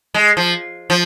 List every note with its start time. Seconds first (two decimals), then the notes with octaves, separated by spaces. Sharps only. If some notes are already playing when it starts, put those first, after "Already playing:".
0.14 G#3
0.37 F3
0.90 F3